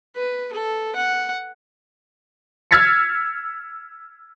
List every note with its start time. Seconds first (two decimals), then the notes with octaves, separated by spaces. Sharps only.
0.16 B4
0.53 A4
0.96 F#5
2.71 E6 F6 G#6 A6 B6 C#7